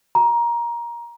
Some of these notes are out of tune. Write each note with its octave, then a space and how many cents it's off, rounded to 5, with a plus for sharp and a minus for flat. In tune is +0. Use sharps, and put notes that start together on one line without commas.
A#5 +15